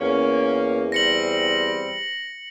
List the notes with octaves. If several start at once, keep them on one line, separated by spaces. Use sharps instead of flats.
E2 A#3 C#4
G3 C4 A#6 C#7 F#7